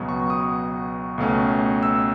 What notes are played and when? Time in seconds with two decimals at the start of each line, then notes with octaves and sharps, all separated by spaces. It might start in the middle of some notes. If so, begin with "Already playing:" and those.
Already playing: C#2 B2 F#3 B3
0.09 C#6
0.30 D#6
1.18 C#2 B2 A3 C#4
1.83 E6